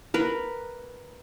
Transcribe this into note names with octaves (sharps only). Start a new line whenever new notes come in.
A#4 B4